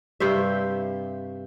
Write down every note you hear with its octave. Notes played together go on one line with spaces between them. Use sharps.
G2 C3 C5 E5